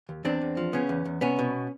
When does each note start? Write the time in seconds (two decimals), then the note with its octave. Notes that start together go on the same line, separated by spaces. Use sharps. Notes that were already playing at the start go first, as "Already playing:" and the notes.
0.09 D#2
0.25 E2 C4 D4
0.42 E2
0.57 F3
0.73 C#3 B3 C#4
0.89 E2
1.05 E2
1.21 C2 B3 C#4
1.39 B2